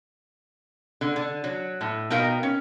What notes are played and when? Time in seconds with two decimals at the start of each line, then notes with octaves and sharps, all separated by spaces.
1.01 D3
1.16 D3
1.44 F#3
1.81 A2
2.10 B2 D#4 A#4 F5 G5
2.43 C#4